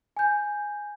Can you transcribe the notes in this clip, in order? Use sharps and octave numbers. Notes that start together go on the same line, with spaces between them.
G#5 G6